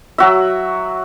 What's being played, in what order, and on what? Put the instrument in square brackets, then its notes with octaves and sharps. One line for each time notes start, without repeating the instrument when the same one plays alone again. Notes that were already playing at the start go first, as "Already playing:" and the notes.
[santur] F#3 F#4 E5